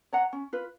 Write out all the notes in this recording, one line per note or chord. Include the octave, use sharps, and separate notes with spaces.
C#5 F#5 A#5
C#4
F4 B4